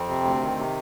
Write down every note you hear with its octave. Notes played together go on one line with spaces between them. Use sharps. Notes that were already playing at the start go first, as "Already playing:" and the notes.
Already playing: F2 C4
C3
D2
D#3
C3